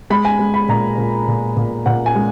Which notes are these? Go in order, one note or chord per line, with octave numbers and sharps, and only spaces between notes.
G#3 B5
G#5
G#3
B5
A#2 A#5
A#2
A#2
A#2
A#2 F#5
G#5
G#3